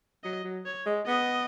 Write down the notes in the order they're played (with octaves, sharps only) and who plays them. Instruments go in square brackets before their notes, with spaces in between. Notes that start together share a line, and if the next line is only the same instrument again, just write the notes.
[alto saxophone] F#3 [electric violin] D#5
[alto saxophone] F#3
[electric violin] C#5
[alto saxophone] G#3
[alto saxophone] B3 [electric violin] D#5